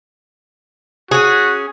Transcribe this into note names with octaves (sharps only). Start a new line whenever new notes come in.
C#4 F#4 G#4